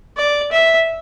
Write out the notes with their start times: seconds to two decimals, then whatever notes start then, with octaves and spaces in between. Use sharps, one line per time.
0.17 D5
0.52 E5